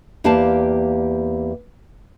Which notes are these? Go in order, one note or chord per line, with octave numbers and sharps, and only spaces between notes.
E2 A#3 G4 D5 F5 A5